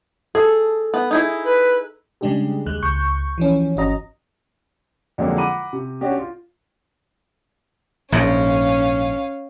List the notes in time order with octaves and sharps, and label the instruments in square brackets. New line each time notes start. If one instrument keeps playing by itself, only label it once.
[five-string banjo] G#4 [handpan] A4
[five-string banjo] B3
D#4 E4 G#4
[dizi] B4
[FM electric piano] C#3 G3 G#3 D4 G4 G#4
D#2 G#3 F#6
C#2 C#6 G6
E3 F3 C#4
G1 C#4 F#4 D#5 A#5
[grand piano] F2 D3 F#3 G#3 A#3
F#5 A#5 B5 D6 D#7
C3
C#4 D4 F#4 G4
F4
[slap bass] A#1 G#2 [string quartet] C#4 F5